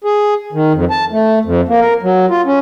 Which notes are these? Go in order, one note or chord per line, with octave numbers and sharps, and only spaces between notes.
G#4
D#3
F2
A5
A3
F2
A#3
A#4
F#3
F4
C#4